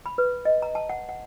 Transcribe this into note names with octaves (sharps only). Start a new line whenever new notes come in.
B5
B4
D#5
A#5
A5
F#5
F#5